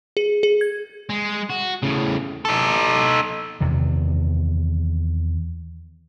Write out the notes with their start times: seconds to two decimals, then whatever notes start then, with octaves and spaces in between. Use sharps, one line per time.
0.17 G#4
0.43 G#4
0.61 G#6
1.09 G#3
1.50 F#4
1.83 A2 C#3
2.45 D#4 A4
3.61 E2 C3 D#3